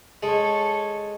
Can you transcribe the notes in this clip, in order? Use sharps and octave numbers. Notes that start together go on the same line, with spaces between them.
G#3 A4 C#5